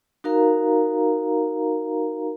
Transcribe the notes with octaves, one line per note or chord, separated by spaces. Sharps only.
D#4 F#4 A#4 F5 A#5